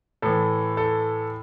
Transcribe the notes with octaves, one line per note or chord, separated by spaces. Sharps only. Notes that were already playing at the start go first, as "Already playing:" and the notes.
A2 E3 A4
A4